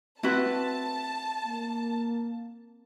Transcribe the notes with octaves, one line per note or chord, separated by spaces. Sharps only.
C4 E4 F#4 B4 A5
A#3